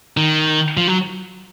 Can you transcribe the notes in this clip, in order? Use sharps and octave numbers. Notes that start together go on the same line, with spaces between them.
D#3
F3
F#3